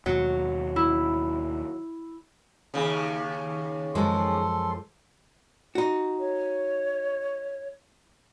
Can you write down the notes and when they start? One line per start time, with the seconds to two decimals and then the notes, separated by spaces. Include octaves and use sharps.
0.06 D#2 B2 F#3
0.76 E4
2.74 D#2 C#3
3.95 F#2 F3 G#3 A4 C6
5.75 D#4 F#4
6.20 C#5